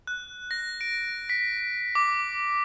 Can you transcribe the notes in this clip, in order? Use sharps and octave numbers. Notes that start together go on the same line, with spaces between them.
F#6
A#6
D7
B6
D6